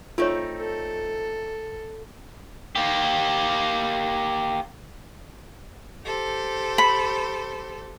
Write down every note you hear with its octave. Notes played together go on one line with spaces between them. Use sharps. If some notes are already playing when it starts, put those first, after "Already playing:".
A3 C4 D#4 F4 C#5
A4
A#3 G4
G4 A4 C5
B5